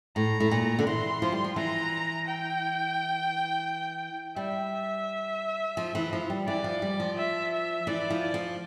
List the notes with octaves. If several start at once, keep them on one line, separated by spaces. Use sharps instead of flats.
A2 A#5
A2
A#2
D3
E3 C6
F3
G3
F3
E3 A#5
G5
G3 E5
F3
E3
F3
G3
E3 D5
F3
G3
F3
E5
E5
E3 D5
F3
D5
F3